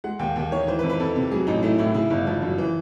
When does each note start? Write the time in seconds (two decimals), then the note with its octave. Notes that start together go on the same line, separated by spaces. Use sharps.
0.04 G#3 F#5
0.19 D#2 G5
0.36 D#2 G5
0.51 D#3 C#5
0.67 E3 C5
0.79 B4
0.83 F2
0.90 B4
1.00 F2 A4
1.16 C3
1.31 F#3 G#4
1.47 A1 D#4
1.63 A3 E4
1.78 A2 E4
1.94 C#3 E4
2.10 G1 D#4
2.27 F3
2.42 F#2
2.58 E3